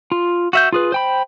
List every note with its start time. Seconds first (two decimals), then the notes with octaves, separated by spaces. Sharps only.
0.12 F4
0.53 F#4 E5 G6
0.73 F4 G#4 B4
0.92 C5 G5 B5